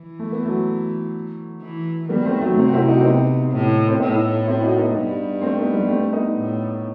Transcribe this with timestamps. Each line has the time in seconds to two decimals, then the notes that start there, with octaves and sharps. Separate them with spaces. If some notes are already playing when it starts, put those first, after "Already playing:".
Already playing: E3
0.19 A3
0.32 B3
0.45 F#3 A3
1.62 E3
2.09 D#3 G3 B3
2.25 A3 C4
2.41 F#3 A3
2.57 C3 A3 C4
2.68 F#4
2.73 C4 E4
2.88 D#4 F#4
3.01 C4
3.05 B3 D#4
3.52 A2
3.88 C4
3.99 A2 B3 D#4
4.46 C4 E4
4.63 D#4 F#4
4.78 B3 D#4
4.95 G2
5.42 A3 C4
5.58 B3 D#4
5.73 G3 B3
5.89 A3 C4
6.13 B3 D#4
6.37 A2